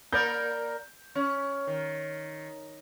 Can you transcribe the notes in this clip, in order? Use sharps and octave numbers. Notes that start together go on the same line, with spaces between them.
A#3 A#4 D5 G6
C#4
D#3